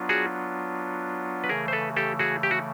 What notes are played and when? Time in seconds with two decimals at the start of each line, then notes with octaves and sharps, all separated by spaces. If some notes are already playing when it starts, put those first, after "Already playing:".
Already playing: F#3 B3 D4 F4
0.09 F#4 G#4
1.44 B4
1.49 C#3 E3 A3 G#4 A#4
1.68 C5
1.73 A4 B4
1.96 G4 A4
2.19 F#4 G#4
2.43 G4
2.51 F#4